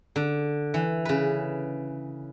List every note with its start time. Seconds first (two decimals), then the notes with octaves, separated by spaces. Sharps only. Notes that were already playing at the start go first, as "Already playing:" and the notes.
0.16 D3
0.74 E3
1.05 C#3 B4